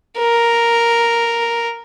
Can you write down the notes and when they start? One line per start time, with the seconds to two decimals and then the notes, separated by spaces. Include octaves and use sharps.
0.18 A#4